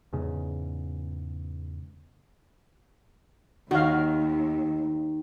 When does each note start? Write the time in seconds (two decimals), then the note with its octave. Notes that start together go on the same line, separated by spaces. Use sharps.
0.13 E2 G#2 C#3
3.71 D#2 D#3 F#4 F5